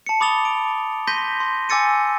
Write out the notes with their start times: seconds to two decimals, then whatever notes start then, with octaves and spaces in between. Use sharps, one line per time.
0.06 A5 C#7
0.20 B5 D6 D#6 A6 F7 G7
0.45 D7
1.07 C6 G6 A#6 B6 D#7 G7
1.40 C6
1.69 G#5 D6 E6 A6 C#7 D#7